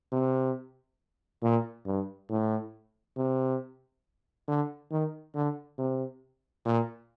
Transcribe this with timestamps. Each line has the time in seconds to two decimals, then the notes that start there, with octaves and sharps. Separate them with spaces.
0.12 C3
1.43 A#2
1.86 G2
2.30 A2
3.17 C3
4.48 D3
4.91 D#3
5.35 D3
5.78 C3
6.65 A#2